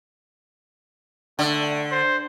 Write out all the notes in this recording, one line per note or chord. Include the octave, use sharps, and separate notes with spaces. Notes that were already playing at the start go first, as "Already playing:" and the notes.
D3 A3
C5